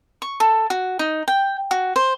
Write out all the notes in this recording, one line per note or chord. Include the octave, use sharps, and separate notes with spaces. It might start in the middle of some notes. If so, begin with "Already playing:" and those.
C#6
A4
F#4
D#4
G5
F#4
C5